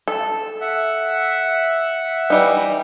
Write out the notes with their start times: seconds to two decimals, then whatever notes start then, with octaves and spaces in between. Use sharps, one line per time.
0.08 A4
0.61 E5 F#5
2.30 E3 G3 D#4